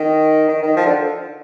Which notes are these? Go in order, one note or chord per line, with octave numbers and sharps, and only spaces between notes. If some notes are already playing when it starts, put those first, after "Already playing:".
Already playing: D#3
D#3
D#3
F3
D3